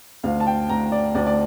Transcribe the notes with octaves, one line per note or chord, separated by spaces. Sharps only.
D2 F5
A5
G5
D2 A#5
D5
D2 D5
D5